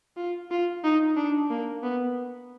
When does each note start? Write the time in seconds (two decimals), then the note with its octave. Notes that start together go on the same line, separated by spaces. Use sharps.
0.17 F4
0.51 F4
0.84 D#4
1.17 D4
1.50 A#3
1.83 B3